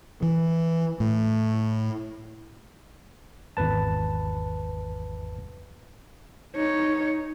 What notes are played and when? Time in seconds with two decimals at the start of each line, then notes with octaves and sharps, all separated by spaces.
0.22 E3
1.00 A2
3.57 G#1 E2 B4 A5
6.57 D#4 C#5